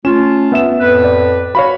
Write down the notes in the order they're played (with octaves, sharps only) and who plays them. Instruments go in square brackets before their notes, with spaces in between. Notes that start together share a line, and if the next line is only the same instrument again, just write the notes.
[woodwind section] A3 F4 [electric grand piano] C#4 E7
[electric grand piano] B3 E5 E7
[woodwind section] F2 A2 B4
[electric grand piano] D5
[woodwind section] F#4 [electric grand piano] C#5 F5 B5